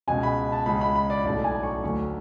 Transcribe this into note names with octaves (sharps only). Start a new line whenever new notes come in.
C#2 B2 G#3 G#5
B5
A5
C#2 C#3 G#3 B5
B5
B5
D5
B1 A2 F#3 A3 D5
G#5
C#6
D2 D3 F#3 A3 C#6